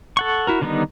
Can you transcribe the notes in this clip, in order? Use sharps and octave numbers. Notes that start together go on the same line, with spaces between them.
A4 F#5 C#6
E4 F#4 A#4
D3 D#3 G3 B3 D#4